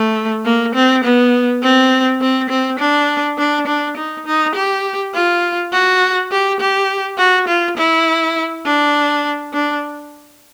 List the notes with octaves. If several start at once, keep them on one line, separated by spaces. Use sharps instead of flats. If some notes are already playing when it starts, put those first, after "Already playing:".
Already playing: A3
A#3
C4
B3
C4
C4
C4
D4
D4
D4
D#4
D#4
G4
F4
F#4
G4
G4
F#4
F4
E4
D4
D4